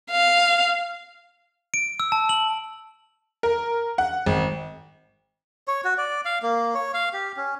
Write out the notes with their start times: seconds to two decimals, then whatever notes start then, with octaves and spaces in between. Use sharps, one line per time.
0.11 F5
1.74 D7
2.00 E6
2.12 A5
2.29 F#7
3.43 A#4
3.98 F#5
4.26 G#1
5.68 C#5
5.84 F#4
5.97 D5
6.25 F5
6.42 A#3
6.74 C#5
6.94 F5
7.13 G4
7.37 C#4